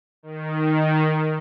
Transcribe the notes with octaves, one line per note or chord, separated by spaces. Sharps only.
D#3